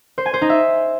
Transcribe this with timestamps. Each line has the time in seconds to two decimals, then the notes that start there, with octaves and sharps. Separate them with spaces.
0.18 C5
0.26 G#5
0.34 C5
0.42 D#4
0.50 E5